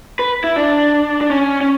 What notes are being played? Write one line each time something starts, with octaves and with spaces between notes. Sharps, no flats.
B4
E4
D4
D4
C#4
C#4